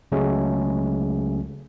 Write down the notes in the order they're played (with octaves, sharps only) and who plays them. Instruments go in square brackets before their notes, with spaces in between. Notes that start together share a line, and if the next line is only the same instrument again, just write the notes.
[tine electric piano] C#2 C#3 F#3 G#3 A3 C#4